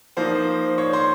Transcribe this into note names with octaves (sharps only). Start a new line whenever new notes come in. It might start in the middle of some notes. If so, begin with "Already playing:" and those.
F3 A#3 D#4 C5 C6
C#5 C#6
C5 C6